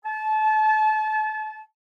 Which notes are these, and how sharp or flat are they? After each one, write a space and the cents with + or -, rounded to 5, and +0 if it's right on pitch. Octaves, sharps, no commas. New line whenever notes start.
A5 -30